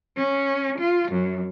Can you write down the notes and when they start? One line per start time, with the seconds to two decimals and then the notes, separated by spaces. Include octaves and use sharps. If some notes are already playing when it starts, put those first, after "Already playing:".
0.17 C#4
0.79 F4
1.12 F#2